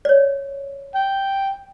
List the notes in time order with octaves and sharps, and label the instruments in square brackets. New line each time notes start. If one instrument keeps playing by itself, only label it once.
[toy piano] C#5 D5
[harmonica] G5